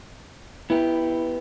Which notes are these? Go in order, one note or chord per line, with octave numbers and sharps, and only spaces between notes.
B3 E4 G4